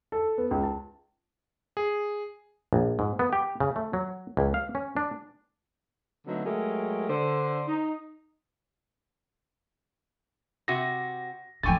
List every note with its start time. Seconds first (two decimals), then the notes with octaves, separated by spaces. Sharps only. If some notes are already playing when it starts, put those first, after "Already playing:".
0.12 A4
0.38 B3
0.51 C#2
0.63 A5
1.77 G#4
2.73 A#1
2.99 G#2
3.19 B3
3.33 G4
3.60 C#3
3.76 A3
3.93 F#3
4.37 C#2
4.54 F5
4.75 C#4
4.97 D4
6.27 D3 F#3 A3 B3 C4 D#4
6.45 F#3 G#3 A3 G4 A#4
7.09 D3 C5
7.68 D#4
10.68 C3 F#4 A#6
11.63 A2 D3 F3 G5 G#5 C#6 A6